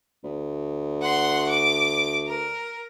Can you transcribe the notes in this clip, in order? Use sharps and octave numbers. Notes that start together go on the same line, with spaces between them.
D2
F#5 C6
D6
A#4